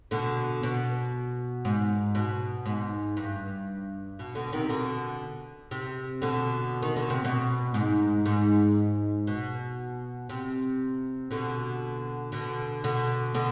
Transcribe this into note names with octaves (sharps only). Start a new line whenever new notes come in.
B2 D3
B2
G#2
B2
G#2
G2
B2
B2 D3
C3 D#3
B2 D3
C3
B2 D3
D#3
D3
C3
B2
G#2
G#2
B2
C3
B2 D3
B2 D3
B2 D3
B2 D3